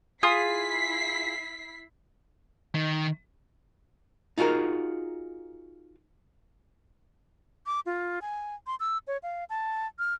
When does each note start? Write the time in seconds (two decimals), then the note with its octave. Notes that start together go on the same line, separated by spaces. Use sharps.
0.23 E4 F4 G#4 D#6 B6 C7
2.75 D#3
4.38 D#4 F4 F#4 G#4 A#4
7.66 D6
7.86 F4
8.22 G#5
8.67 C6
8.80 E6
9.07 C#5
9.23 F5
9.50 A5
9.99 F6